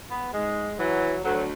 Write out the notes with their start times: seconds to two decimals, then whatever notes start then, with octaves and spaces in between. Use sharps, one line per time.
0.10 B3
0.33 G#2 G#3
0.79 E3 F#3
1.24 D2 F#3